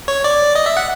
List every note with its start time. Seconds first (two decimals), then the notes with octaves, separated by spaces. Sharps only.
0.08 C#5
0.24 D5
0.55 D#5
0.66 E5
0.77 F#5